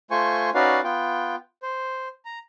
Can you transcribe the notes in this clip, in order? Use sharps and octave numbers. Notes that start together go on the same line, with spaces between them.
A3 F4 C5 G#5 C#6
C#4 D#4 F#4 B4 D5 F5
B3 F4 G5
C5
A#5